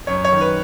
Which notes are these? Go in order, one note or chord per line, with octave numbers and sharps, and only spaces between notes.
F#2 C#5
C#5
D#3
B4